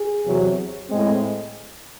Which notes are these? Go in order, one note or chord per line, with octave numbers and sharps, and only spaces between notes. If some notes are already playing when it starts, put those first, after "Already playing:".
Already playing: G#4
E2 C3 F#3
A2 G#3 C4